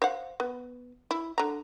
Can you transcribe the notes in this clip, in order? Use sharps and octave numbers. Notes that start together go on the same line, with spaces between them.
C5 F5 F#5
B3
E4
D3 A#5